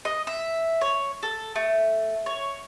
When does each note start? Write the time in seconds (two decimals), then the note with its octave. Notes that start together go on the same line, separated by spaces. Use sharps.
0.05 D#5
0.27 E5
0.81 C#5
1.23 A4
1.56 A3
2.26 C#5